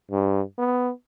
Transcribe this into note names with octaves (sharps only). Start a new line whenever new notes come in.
G2
B3